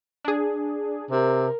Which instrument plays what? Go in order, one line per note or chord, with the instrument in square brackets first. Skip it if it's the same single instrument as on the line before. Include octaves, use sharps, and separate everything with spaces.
[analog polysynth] D4 G#4
[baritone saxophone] C3 [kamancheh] A#4